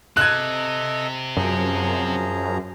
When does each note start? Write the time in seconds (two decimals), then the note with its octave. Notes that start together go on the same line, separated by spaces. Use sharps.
0.17 C3 A4 D#5 F#6 G#6
1.37 F#2 F3 G#4 A#5